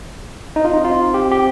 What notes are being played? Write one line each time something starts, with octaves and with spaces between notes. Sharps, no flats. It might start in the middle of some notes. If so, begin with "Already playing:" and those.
C4 D#4
F4
D#4
F4
G4
G4